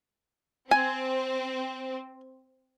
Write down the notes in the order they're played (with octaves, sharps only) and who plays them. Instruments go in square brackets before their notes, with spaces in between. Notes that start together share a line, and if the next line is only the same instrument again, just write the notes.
[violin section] C4 [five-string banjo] G#5